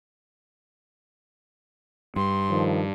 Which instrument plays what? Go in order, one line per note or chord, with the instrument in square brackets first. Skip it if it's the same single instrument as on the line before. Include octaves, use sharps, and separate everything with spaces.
[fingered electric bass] G2 [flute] C6
[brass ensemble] D#3 F3